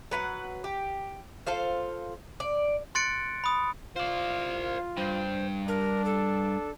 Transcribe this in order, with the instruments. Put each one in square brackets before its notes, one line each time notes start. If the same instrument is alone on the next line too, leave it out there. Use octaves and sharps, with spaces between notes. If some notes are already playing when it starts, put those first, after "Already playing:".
[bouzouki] F#3 B4 F#5
G4
F4 A4 C5 F5
D5
[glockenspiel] C6 F#6 A6 C#7 D7
B5 D#6
[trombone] F4 [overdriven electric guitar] C5 D5 [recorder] F5
[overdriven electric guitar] G2 [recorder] C5
[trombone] D4 [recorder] A#4
[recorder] A4